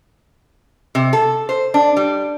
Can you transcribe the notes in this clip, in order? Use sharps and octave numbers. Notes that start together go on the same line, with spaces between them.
C3
A4
C5
D4
G3